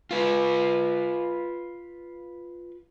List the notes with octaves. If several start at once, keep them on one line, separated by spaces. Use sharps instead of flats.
F4 B4